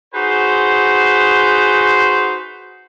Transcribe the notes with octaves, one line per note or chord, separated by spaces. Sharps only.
D#4 F#4 G#4 B4 C5